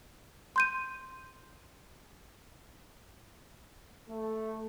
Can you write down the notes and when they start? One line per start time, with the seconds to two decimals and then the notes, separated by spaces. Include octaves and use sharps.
0.56 C6 G6 D#7
4.09 A3